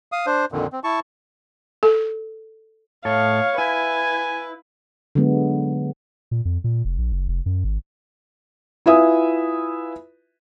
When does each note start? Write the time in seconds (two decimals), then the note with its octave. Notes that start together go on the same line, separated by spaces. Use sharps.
0.12 F5 D#6
0.26 D4 C5
0.52 F2 A#2 D3 D#3
0.72 C4
0.84 E4 A5 C#6
1.83 A4
3.05 A2 A4 C#5 F5
3.58 E4 B4 G#5
5.15 D3 F#3 G#3 B3
6.31 A#2
6.45 F2
6.64 A#2
6.85 F1
6.98 A#1
7.12 F#1
7.28 F1
7.46 F#2
7.64 G#1
8.86 E4 F4 B4 E5 G#5 D#6